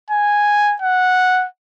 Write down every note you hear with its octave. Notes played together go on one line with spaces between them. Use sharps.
G#5
F#5